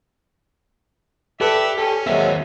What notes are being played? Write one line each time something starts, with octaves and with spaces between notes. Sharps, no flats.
G4 A4 B4 D5 E5
C#4 A4
D#2 F#3 G#3 A#3 C4 E5